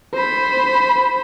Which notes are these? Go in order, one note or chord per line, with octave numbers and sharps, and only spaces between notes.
C5 B5